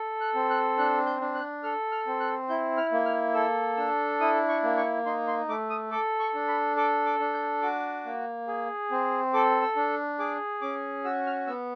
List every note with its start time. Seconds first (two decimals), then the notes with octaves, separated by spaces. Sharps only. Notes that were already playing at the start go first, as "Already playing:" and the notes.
Already playing: A4
0.21 F#6
0.35 C4
0.50 F#6
0.78 D4 F#6
1.06 G6
1.21 D4
1.35 F#6
1.63 A4 F6
1.92 F6
2.07 C4
2.20 F#6
2.49 E4 G6
2.77 F6
2.92 A#3
3.06 F6
3.34 A4 E6
3.77 D4 E6
4.20 E4 D#6
4.49 C#6
4.63 A#3
4.77 C#6
5.06 D#4 C6
5.27 C6
5.48 A3 D6
5.70 D#6
5.91 A4 D6
6.20 C#6
6.34 D4
6.48 B5
6.76 A4 D6
7.06 D6
7.19 D4
7.34 G6
7.62 F#4 D6
8.05 A#3
8.48 G#4
8.91 C4
9.33 A4 D6
9.62 E6
9.76 D4
10.19 G#4 D6
10.61 C#4 D6
11.04 F#4 E6
11.26 F6
11.47 B3 E6